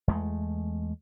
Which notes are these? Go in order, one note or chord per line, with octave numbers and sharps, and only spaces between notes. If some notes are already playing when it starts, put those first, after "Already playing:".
E2 G#3 A3